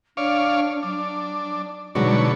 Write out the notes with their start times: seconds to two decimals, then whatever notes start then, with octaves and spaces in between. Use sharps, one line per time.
0.17 D4 C#5 D5 F5
0.83 F#3 D4
1.95 B2 D3 F#3 G#3 D#4 F#4 C#5